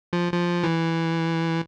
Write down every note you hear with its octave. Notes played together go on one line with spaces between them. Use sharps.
F3
F3
E3